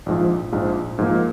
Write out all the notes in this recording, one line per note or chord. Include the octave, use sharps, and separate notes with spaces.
A#1 G#2 F3
A#1 G#2 F3
G#2 F3 A#3